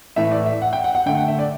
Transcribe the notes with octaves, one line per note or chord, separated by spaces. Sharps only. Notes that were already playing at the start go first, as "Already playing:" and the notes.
A2 E3 A3 E5
D5
E5
F#5
G5
F#5
F#5
D3 A3 G5
F#5
E5
D5